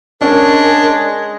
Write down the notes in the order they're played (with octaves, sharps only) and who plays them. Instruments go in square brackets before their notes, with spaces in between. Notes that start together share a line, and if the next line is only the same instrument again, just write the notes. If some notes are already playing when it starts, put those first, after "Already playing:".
[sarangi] G#3 [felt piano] C#4 [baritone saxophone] D4 [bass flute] A#4